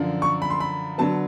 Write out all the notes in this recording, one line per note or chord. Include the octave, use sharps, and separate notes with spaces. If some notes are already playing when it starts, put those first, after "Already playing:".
Already playing: F#2 D3 F3
C#6
B5
C6
B5
D3 F#3 B3 A5